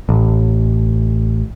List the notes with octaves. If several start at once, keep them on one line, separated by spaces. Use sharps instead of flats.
A1